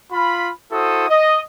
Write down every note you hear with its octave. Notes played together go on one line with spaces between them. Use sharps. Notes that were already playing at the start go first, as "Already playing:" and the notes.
F4 B5
E4 F#4 A4 C5 D#6
D#5